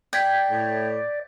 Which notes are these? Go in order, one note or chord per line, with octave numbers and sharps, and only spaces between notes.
D5 G5 G6 G#6 B6
A2